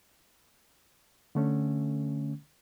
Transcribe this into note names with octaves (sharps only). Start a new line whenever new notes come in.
D3 A3 C#4